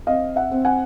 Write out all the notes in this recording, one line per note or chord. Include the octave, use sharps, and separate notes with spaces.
C4 D#5 F5
E5 F#5
C4
F#5 G#5